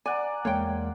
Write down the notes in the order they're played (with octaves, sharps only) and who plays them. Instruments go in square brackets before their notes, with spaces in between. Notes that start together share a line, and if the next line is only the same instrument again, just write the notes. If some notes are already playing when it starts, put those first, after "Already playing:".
[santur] D5 F#5 A#5 [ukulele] G#5
[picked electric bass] E2 G#3 A#3 [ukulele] C#5 G5